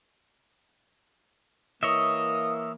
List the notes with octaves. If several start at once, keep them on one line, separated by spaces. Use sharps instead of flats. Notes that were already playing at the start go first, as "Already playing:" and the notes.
E3 A#3 C#5 D#5 E5 D#6